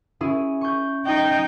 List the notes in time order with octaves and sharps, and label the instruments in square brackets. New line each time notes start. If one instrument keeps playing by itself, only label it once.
[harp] C#4 E4 G#4
C#6 G6
[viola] D#4 [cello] G5